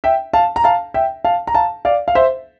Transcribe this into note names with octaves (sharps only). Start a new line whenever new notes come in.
E5 G5
F5 A5
A#5
F5 A5
E5 G5
F5 A5
A#5
F5 A5
D5 F5
F5
C5 E5